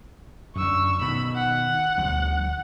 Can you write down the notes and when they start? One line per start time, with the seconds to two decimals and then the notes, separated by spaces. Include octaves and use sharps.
0.56 F#2 D3 C#6 E6
1.01 B2 D#3 B5
1.36 F#5
1.97 D2 F3 G3